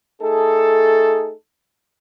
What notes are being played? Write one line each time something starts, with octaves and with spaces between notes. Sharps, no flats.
A3 D#4 G#4 A4